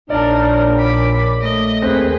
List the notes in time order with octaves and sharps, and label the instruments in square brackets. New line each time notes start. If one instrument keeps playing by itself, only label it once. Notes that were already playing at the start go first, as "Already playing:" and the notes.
[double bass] A#1 [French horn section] D4 C#5 [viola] D#4 A#4 [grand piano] D5 A5
[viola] B5 D6
[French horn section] A3 [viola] D#5
[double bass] D#2 [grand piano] C4 [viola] G#4 B4